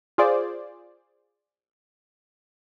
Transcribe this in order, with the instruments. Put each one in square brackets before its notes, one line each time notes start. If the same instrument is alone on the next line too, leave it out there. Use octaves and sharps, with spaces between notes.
[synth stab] F4 G#4 C5 D5